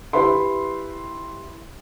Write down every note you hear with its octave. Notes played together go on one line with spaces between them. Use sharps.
E4 G4 B4 E5 B5 C6